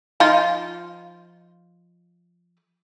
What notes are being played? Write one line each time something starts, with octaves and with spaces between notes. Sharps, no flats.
F3 D#4 F4